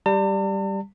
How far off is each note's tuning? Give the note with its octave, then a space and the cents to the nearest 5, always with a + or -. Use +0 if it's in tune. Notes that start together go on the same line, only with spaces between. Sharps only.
G3 +0 A5 +45